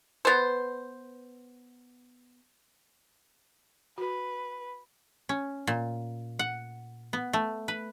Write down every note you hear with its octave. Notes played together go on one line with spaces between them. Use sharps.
B3 C5
F#4 B4
C#4
A#2
F#5
B3
A3
B4